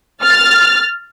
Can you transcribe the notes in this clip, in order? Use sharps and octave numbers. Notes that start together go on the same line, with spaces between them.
F6 A6